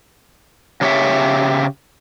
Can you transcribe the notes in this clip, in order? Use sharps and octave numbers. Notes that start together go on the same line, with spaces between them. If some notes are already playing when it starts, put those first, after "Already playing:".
C#3 G4 C#5 E5